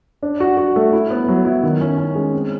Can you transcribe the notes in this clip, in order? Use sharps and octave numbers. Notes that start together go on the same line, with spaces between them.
D4
F#4
F#4
A3
E4
B3
F#3
E4
D#3
C#4
C#4
G#3
C4